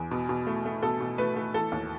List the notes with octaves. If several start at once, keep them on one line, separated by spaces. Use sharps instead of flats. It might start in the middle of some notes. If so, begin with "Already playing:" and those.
Already playing: E2
B2
B2
A3
A3
B2 A4
B2
A3 B4
A3
E3 A4
D#2